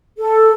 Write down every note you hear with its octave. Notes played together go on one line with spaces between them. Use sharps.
A4